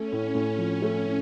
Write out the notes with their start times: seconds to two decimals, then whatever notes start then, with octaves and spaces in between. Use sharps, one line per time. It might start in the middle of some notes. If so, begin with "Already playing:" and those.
Already playing: A3 C#4
0.12 A2
0.35 A2
0.59 F3
0.82 A3
1.06 A2